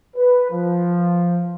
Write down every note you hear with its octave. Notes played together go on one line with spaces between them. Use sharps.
B4
F3